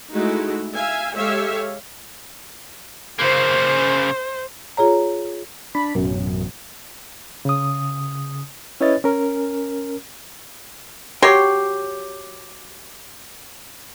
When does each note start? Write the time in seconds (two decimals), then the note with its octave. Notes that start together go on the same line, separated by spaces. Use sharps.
0.12 G#3 A3 D#4 E4 F#4
0.76 E5 F5 G#5
1.14 G#3 G4 A4 C#5 E5 F5
3.19 C#3 A#3 C5
4.77 F4 G#4 C#5 A#5
5.75 D4 B5
5.95 A1 F#2 B2
7.45 C#3 D#6
8.81 C#4 E4 B4 C#5 D#5 A6
9.04 C#4 A#4
11.22 F#3 G4 C#5 C6